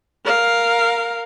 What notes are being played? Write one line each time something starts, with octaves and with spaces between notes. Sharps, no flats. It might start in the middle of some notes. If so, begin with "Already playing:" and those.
A#4 F5